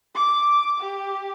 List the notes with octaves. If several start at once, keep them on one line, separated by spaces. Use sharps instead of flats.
D6
G4